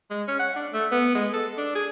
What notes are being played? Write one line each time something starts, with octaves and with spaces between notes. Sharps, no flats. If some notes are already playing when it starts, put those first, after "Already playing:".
G#3
C#4
F#5
D4
A3
B3
G#3
A4
D4
G#4